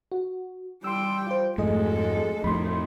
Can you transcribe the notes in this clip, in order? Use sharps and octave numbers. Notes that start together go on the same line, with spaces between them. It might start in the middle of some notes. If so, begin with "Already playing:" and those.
F#4
G3 G5 C6 E6
F4 C5
F2 G#2 G#3 A3 G#4 A4 D#5
F2 A2 F3 A3 D#4 B5 C6